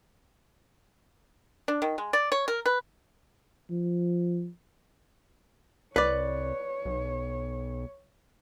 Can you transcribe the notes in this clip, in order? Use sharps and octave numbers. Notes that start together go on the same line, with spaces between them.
D4
D#3
G#3
D5
C#5
A#4
B4
F3
C2 B4 C#5 D5
B1